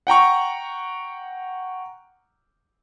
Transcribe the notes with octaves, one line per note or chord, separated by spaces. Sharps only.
F#5 G5 A#5 C#6